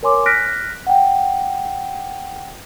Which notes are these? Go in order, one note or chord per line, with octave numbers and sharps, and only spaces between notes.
A#4 C#5 G#5 C6 D6
F6 F#6 A#6 B6 D7
F#5 G5